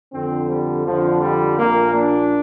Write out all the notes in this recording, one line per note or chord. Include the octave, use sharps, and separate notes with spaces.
F2 D3 C4
G3
F2 D3 F3
G3
A#1 A#2 A#3
D4